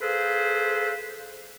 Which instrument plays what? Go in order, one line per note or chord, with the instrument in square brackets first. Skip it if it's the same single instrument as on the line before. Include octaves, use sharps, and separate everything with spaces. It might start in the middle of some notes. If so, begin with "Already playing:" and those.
[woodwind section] G#4 A4 B4 C5 F5